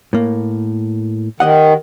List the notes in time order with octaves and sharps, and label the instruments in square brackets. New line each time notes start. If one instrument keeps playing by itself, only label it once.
[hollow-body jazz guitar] A2 A#3
[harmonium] D#3 [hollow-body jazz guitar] G4 D#5 F#5